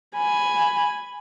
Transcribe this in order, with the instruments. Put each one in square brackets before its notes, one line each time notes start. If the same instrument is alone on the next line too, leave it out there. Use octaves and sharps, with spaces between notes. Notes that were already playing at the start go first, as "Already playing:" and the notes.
[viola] G#5 B5